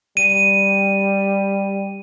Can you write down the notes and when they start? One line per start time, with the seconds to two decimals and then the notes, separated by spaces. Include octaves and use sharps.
0.17 G3 D#7